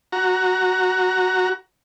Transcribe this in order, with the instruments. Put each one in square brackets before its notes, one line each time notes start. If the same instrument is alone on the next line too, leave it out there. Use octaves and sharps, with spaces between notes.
[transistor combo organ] F#4 A#5